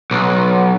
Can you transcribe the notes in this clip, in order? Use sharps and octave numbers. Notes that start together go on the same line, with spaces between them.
B1